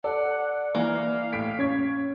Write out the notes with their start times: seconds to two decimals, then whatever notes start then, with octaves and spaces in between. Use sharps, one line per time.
0.04 A4 D5 F#5
0.75 E3 A#3 F5
1.32 A2 B6 D7
1.59 C#4 C#6 G#6 B6